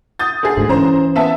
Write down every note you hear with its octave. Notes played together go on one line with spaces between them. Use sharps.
D#6 G6 A6
D3 G#4
D2 G#2
E3 C#4 C5 A#5
B3 E5 A5